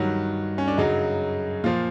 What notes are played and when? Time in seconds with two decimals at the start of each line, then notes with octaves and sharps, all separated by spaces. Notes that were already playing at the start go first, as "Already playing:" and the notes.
Already playing: G2 D#3 F#3
0.58 C#4
0.68 D4
0.78 F#2 C#3 F#3 D#4
1.64 A#2 F3 F4